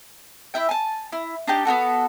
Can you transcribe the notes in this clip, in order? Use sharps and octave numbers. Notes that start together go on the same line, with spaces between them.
E4 E5 G5
G#5 A5
E4
D4 D#4 G4
B3 D#4 F#4 A4